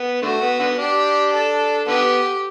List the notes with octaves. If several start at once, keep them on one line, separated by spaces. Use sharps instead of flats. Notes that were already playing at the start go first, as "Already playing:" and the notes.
Already playing: B3
D3 A3 F#4
B3
D3 B3
D4 G4
A4
D3 B3 G4